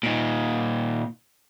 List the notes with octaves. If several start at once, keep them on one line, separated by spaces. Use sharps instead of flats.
A#2 D#4